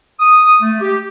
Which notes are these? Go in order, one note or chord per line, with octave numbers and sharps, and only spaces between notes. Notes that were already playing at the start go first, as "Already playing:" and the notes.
D#6
A3
G4